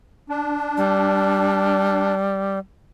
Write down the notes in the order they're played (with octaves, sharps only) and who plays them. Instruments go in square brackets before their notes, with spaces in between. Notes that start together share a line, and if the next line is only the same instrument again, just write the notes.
[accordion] D4
[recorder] G3